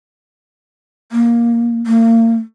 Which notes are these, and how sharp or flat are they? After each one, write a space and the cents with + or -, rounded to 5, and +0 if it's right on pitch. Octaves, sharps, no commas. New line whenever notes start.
A#3 +10
A#3 -40